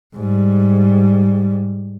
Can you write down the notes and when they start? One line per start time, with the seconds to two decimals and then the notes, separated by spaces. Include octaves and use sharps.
0.15 G#2 G3